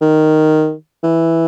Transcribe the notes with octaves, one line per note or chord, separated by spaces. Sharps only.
D#3
E3